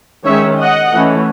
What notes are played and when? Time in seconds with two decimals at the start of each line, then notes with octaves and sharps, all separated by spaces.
0.25 D#3 G#3 C#4 C#5 E5
0.60 D#5 F#5
0.95 E3 A3 C#4